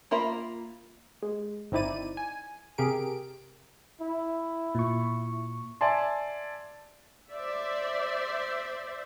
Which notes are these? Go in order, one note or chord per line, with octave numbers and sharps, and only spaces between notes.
A#3 F4 A#4 E5 B5
G#3
G1 C4 D#4 E4 D5 D#7
G#5
C3 G4 G#4 A#4 D7
E4
A#2 C#6
D5 E5 G#5 A5 C6
C5 D5 E5